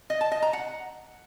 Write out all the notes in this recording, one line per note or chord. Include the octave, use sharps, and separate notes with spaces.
D#5
A5
D#5
A#5
F#5